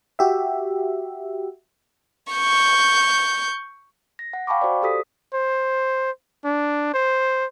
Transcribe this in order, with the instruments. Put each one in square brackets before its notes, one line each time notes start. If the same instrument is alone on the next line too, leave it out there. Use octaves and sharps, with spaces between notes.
[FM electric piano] F#4 G4 E5
[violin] C#6 G6
[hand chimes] A#6
F#5
F5 G5 A5 B5 C#6 D6
F#4 C5 D5
F#4 G4 A4 D#6 B6
[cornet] C5
D4
C5